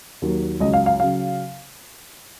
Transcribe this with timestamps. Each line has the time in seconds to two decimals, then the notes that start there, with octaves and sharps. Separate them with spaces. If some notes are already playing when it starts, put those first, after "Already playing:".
0.22 D#2 D#3 F#3
0.60 C#2 C#3 F#3 D#5
0.73 F5
0.86 F5
1.00 C#3 F#3 F5